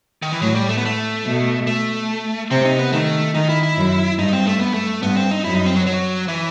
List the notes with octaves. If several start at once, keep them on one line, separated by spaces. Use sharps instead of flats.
D#3
E3
A2 F#3
G3
A3
B3
A3
B2
A3
C3 C4
D#4
B3
D#3 A3
D#3 D#4
E4
E4
F#2
G2 D#4
C4
A3
B3
A3
G2 B3
C4
D#4
F#2 E4
D#4
C4
F#3
F#3
E3